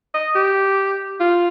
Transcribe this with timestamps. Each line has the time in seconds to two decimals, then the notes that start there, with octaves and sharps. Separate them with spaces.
0.14 D#5
0.35 G4
1.20 F4